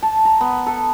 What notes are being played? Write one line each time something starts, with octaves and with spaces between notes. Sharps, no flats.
A5
A#5
B3
A4